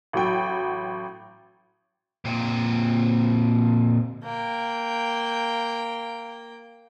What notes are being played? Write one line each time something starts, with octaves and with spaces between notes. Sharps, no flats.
A1 F#3 G5
A#2 C4
A#3 G5